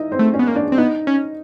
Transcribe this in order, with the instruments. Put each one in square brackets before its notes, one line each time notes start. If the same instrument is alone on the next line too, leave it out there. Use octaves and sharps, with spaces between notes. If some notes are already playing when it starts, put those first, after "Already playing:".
Already playing: [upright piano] D#4 E4 D#5
C4 C5
[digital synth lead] A3
[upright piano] C#4 C#5
[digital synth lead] B3
A#3
[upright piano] D4 D5
[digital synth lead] C4
[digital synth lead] B3 [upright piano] D#4 D#5
[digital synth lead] C#4